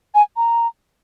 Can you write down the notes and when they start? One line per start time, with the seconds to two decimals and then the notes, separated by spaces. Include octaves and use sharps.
0.15 G#5
0.36 A#5